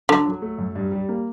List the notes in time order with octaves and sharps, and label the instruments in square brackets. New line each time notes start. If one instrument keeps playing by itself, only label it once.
[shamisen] D3 [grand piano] F#3
[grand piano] F#3
A3
F#2
G2
G3
A#3